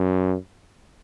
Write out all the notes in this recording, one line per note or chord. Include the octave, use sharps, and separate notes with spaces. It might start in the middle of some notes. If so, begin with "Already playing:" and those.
Already playing: F#2